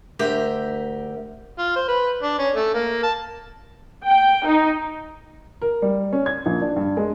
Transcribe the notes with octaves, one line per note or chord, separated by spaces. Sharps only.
D2 G4 A#4 E5
F4
C5
B4
D4
C#4
A3
A#3
A5
G5
D#4
A#4
G3
C#4
G#6
A#1
D4
G2
G#3